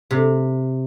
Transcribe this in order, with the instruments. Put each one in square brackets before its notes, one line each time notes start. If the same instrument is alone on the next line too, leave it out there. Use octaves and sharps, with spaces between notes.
[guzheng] C3